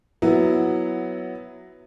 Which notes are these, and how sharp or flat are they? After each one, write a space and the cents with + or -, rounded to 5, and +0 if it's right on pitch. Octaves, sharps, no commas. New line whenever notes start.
F#3 +0 B3 +5 E4 +0